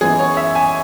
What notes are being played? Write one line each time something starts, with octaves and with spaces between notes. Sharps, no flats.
F#2 E3 G#3 B3 G#4
C#5
E5
G#5